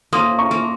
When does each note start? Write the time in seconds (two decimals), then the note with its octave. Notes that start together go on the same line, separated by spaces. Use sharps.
0.13 A#3 C6 D#6
0.38 A#5 C#6
0.51 A#3